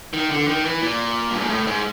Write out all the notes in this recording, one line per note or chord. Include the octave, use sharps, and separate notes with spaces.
D#3
D3
D#3
E3
A#2
G2
G#2
A2
G#2